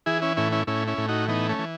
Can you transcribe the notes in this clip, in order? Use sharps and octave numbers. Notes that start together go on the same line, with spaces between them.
E3 E4 G#4
C#4 E4
A2 C#4 E4
C#4 E4
A2 C#4 E4
C#4 E4
A2
D#4 F#4
E3 B3 D#4
A3 C#4
E3